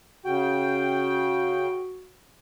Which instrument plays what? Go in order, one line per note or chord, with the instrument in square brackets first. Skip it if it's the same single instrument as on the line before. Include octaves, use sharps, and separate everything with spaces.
[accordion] C#3 G5 [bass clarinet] F#4